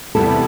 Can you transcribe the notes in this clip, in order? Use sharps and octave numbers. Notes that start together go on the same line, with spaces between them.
E2 C3 G3 B3 E4 A4